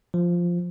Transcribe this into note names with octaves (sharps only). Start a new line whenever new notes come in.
F3